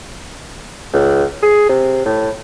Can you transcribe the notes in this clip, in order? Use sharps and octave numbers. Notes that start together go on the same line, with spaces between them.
C#2
G#4
C3
A2